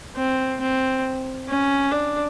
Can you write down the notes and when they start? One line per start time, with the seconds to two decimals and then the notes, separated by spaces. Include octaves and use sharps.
0.16 C4
0.60 C4
1.48 C#4
1.91 D4